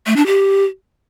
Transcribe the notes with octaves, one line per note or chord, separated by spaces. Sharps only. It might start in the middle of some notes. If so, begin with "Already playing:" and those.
A3
D4
G4